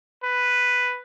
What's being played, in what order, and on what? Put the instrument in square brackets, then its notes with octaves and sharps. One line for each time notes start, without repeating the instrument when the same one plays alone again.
[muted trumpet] B4